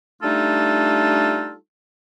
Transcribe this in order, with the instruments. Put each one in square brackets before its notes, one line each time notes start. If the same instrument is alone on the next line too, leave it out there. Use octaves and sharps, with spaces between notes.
[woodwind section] G3 A3 D4 D#4 F4 A4